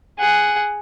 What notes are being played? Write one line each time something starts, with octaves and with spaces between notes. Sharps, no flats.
G#4 F#5